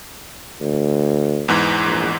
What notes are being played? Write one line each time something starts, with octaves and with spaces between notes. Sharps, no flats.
D2
E2 G#2 E3
A#1